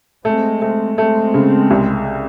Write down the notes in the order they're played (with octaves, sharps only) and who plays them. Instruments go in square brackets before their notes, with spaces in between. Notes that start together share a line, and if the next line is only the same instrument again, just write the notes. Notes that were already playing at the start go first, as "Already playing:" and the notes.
[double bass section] G#3 C4 [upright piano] A3
[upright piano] A3
[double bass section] G#3 C4 [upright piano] A3
[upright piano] C#3
C2